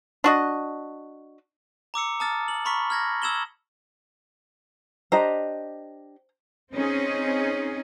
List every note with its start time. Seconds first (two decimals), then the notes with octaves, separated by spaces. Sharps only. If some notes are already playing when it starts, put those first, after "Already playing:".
0.24 D4 F#4 D#5
1.94 A#5 D6 E6 C#7
2.20 A5 A#5 D#6 F6 A6
2.48 F#7
2.65 A#5 B5 C#6 F6 B6
2.90 F6 G#6 A#6
3.22 D#6 E6 G#6 E7 F#7 G7
5.12 D4 G4 C5 D#5 A#5
6.73 C4 C#4 D#4 G#4